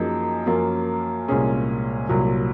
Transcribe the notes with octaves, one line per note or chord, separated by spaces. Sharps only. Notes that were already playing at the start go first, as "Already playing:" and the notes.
Already playing: F#2 F3 A#3 D#4 G#4
F#2 F3 A#3 C#4 F4
C2 A#2 G#3 C#4 G#4
C2 A#2 F#3